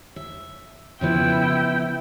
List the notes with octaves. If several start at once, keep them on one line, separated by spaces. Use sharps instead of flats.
E5
C#3 F3 B3 E4 G5